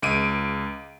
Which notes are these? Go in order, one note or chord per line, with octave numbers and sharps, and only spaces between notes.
C#2 D7 D#7